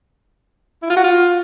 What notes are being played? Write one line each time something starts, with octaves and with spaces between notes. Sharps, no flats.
E4
F4
F#4
F4